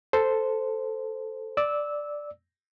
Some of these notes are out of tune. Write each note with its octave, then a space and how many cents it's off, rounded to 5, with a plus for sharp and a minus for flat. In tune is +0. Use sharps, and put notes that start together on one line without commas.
A4 +0 C5 -5
D5 +0 E6 -15